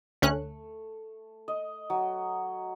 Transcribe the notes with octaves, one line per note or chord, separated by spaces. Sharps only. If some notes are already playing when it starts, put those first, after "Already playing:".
D2 A3 C#4 F#6
D#5
F#3